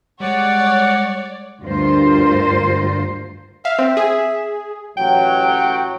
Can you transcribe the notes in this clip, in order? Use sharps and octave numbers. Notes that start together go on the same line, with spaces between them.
G3 G#3 C#5 D5 F#5
D2 G2 F4 A#4 C5
E5 F5
C4
G#4
A1 F#3 G5